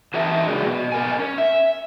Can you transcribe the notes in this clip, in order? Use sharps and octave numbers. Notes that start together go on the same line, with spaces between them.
E3 C4 D#4 A#4 E5 A5
C#3 F#3 G#3 D4
B2
B3 A#4 G#5
C#4
E5